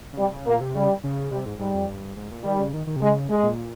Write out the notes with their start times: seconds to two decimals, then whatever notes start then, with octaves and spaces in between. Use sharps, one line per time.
0.13 C#3
0.18 C3 G3
0.33 C#3
0.47 A#2 A#3
0.61 C3
0.75 C#3 G3
1.04 C#3
1.31 C3 G3
1.46 G#2
1.59 G#2 G3
1.74 F2
1.88 G2
2.16 G#2
2.31 A#2
2.44 D#3 G3
2.59 C#3
2.73 D#3
2.87 D#3
2.96 C3
3.01 C#3 G#3
3.30 G#3
3.43 A#2